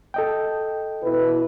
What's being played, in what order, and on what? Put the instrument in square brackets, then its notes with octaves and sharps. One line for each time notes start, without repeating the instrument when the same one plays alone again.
[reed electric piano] A4 D#5 G5
[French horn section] B2 E4 B4